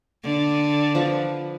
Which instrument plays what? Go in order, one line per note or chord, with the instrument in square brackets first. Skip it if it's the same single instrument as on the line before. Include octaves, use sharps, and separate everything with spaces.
[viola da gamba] D3
[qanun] F3 B4